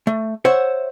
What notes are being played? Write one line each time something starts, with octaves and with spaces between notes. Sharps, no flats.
A3
C5 C#5 E5 F#5